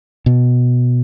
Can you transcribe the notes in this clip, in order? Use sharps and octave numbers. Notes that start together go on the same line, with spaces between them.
B2